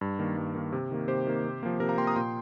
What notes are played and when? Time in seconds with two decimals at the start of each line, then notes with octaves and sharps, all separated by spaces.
0.01 G2
0.19 D#3 A#3
0.37 G2
0.55 D#3 A#3
0.72 C3
0.91 D#3 A#3
1.08 C3 G4 C5
1.27 D#3 A#3
1.45 C3
1.63 F3 A#3
1.80 C3 A#4
1.89 F5 A#5
1.97 F3 A#3 G5 C6
2.07 A#5 D#6
2.16 A#2 G5 C6